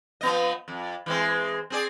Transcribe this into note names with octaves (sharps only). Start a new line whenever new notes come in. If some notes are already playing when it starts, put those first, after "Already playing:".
F3 B3 D#5
F2
E3 G#3 C4
C4 G#4 D5